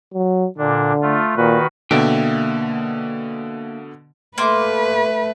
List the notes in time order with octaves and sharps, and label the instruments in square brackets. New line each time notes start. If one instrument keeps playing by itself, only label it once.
[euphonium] F#3
[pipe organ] A#2 D4 [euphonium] D3
[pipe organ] A3 F4
[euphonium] A#2 [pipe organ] D#3 F#4 B4
[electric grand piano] B2 D3 [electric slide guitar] A#3 E5 G5
[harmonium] A3 [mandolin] A#3 C6 D6 [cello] B4